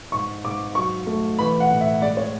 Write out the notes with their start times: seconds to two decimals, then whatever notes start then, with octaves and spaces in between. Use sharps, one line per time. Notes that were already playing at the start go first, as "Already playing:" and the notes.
0.12 G#2 C#6
0.44 G#2 D6
0.75 F#3 C#6
1.07 A3
1.39 E3 B5
1.60 F#5
1.71 A2
1.81 E5
2.02 G#3 D5
2.17 C#5